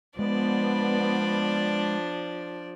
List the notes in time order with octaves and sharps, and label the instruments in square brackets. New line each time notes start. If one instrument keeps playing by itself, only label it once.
[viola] F3 [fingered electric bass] G#3 [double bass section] B3 [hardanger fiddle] D4 D5